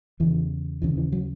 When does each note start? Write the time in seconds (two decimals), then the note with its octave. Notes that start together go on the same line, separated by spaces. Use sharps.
0.20 E2 C#3 E3
0.82 D#2 C#3 E3
0.97 E3
1.12 F#3